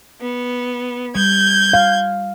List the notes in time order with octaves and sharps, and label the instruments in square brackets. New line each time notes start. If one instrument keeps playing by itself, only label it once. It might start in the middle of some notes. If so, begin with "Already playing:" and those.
[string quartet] B3
[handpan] G3 [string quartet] G6 G#6
[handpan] F5